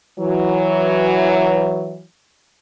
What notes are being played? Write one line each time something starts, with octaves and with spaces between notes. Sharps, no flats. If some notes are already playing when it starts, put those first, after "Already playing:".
E3 F#3